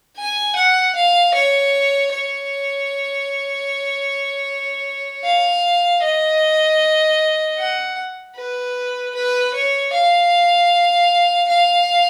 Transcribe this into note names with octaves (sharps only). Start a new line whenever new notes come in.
G#5
F#5
F5
C#5
C#5
F5
D#5
F#5
B4
B4
C#5
F5
F5